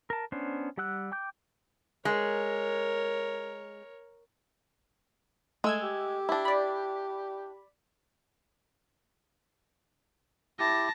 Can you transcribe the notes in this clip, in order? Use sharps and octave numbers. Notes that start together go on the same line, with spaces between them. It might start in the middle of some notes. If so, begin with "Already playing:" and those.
A#4 A5
B3 C#4 D4 C5
G3 G4 F#5 E6 F#6
G5 D6 G6
G#3 A#4 C#5
G#3 A3 E6 G#6
G4
D4 E4
D5 B5
E4 G4 A5 A#6